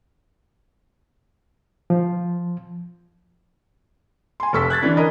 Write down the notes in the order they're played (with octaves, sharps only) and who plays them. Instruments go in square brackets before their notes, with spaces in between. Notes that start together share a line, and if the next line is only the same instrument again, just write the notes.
[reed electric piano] F3
[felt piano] G#5 C6
F1 A4 C#6 E6 B6
F#6 G#6 A6 B6
D3 E3 C#4 D4
A#4 D#5